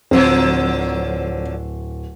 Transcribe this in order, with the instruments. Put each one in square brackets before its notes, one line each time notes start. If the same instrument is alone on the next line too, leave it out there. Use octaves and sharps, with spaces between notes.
[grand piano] D1 [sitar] D3 F3 F#3 [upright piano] C4